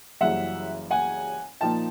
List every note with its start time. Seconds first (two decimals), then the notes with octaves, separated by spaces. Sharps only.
0.21 F#1 F#2 C#3 E3 G3 E5 F#5
0.91 F#5 G#5
1.61 A#2 F3 A#3 D#4 G5 A5